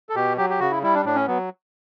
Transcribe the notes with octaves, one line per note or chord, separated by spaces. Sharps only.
A4
B2 G4
F#3 G4
G4
C#3 F#4
E4
G3 E4
D4
A2 D4
C#4
F#3 B3